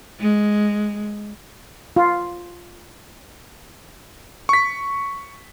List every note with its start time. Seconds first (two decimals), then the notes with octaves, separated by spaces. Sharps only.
0.20 G#3
1.96 F4
4.49 C#6 B6